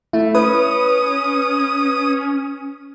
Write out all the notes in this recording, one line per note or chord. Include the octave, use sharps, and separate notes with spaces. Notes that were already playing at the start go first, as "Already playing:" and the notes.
A3 E4
C#4 B4 D#6